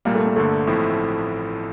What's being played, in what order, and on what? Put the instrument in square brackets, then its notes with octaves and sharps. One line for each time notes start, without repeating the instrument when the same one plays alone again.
[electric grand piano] C2 A#2 G3 [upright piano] A#3
[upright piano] A3
A#3
[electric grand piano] G1 G2 D3 [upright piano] A3
[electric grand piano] A1 A2 F3 C4 E4